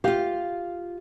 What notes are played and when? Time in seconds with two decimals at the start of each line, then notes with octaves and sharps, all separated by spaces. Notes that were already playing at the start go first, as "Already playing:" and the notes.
0.04 F4 G4 F5